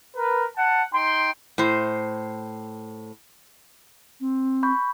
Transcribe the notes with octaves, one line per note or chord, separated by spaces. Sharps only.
A#4 B4
F#5 A5
D#4 G5 C6
A2 C5
C4
B5 C#6 G6